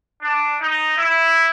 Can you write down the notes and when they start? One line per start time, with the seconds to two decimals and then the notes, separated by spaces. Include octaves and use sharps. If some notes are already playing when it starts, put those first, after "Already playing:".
0.22 D4
0.60 D#4
0.98 E4